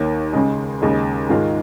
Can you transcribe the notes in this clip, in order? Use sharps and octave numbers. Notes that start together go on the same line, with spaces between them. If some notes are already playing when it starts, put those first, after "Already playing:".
Already playing: D#2 D#3 A#3 C#5
C#2 C#3 G#3 G#4
D#2 C#3 G#3 G#4
G#2 D#3 G#3 F4